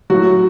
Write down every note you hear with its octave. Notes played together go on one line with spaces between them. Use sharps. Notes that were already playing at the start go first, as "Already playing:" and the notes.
A2 F#3 F#4